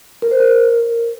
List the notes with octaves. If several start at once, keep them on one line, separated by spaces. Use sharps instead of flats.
A#4
C5
A#4